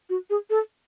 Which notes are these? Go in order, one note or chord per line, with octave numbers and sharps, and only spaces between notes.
F#4
G#4
A4